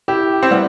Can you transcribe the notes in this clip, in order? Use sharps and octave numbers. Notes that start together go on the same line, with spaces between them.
E4 G4
C4 E4
G3 B3